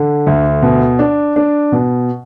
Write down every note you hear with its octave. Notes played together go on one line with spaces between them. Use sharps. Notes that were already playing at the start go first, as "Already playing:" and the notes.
Already playing: D3
D2
B2
D4
D4
B2